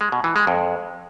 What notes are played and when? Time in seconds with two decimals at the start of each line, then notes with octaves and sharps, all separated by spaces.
0.01 G#3
0.12 B2
0.24 E3
0.36 G#3
0.47 F2